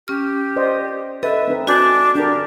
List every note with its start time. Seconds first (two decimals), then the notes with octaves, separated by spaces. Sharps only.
0.08 C#4 G4 F6
0.56 C5 D5 D#5
1.23 A4 B4 D#5 E5
1.48 C4 D#4 B4
1.67 D4 F#4 G#5 G6
2.15 D4 G4 A#4